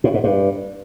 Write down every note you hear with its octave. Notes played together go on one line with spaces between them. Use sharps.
A2
G#2
G2